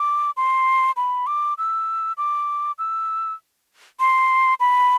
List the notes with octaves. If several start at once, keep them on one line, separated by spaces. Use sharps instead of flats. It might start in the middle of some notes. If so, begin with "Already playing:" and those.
Already playing: D6
C6
B5
D6
E6
D6
E6
C6
B5